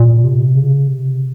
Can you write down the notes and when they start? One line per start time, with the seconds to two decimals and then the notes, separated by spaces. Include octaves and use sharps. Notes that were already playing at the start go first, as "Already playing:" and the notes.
Already playing: A#2
0.24 C3
0.55 C#3
0.87 C3